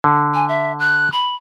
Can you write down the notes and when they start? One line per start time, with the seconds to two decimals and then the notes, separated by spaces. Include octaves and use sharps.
0.04 D3
0.34 G#5
0.48 E5
0.79 F#6
1.12 B5